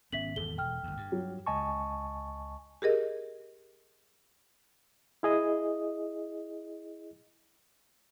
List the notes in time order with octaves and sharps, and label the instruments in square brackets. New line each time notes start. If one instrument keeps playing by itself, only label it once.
[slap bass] G#1 B3 C#4 [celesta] E5 B6 F#7
[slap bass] G#1 E2 G2 [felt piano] A4 [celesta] G7
[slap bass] E1 [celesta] G5 F6
[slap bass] G1 D2
G2
[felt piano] F#3
[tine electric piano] C#2 D#5 G#5 A5 C#6
[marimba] G4 G#4 A#4 D#5
[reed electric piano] E4 G#4 D#5